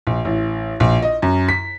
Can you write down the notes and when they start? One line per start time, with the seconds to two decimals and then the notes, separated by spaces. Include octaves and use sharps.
0.07 A#1
0.25 A1
0.80 A#1
1.02 D#5
1.22 F#2
1.48 B6